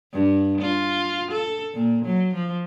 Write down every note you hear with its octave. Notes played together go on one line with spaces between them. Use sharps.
G2
F4
A4
A#2
F#3
F3